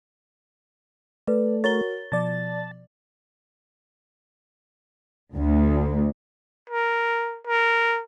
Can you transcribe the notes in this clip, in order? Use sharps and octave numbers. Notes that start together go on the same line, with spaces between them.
A3 B4 D5
F#4 A#4 C#5 A6 G7
B2 F3 D5 A5
D2
A#4
A#4